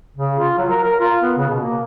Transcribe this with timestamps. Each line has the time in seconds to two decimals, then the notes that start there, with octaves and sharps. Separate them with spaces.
0.17 C#3
0.38 F4
0.58 F#3
0.70 A#4
0.84 A#4
1.00 F4
1.22 B3
1.37 C#3
1.49 B2
1.62 A#3